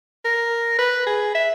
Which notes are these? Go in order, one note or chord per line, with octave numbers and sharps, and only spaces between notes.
A#4
B4
G#4
E5